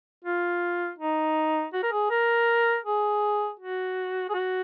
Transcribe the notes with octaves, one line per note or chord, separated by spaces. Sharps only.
F4
D#4
F#4
A#4
G#4
A#4
G#4
F#4
G#4
F#4